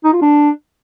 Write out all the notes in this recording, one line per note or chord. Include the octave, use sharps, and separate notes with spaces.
D#4
F4
D4